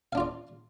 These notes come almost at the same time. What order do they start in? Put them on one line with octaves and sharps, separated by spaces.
F5 D4 F4 D5